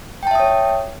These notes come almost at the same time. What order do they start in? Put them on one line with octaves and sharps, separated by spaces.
G5 A5 E5 D#6 C#5